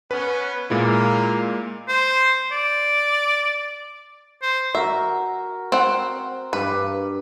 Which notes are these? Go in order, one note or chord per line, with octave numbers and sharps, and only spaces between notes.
B3 C#4 B4
A#2 G#3 A#3 E4
C5
D5
C5
F#4 A#4 E5
C4 F#5
G2 B4 D6